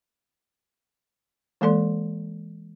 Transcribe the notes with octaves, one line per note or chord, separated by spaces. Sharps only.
E3 G#3 A#3 A4 D5 C6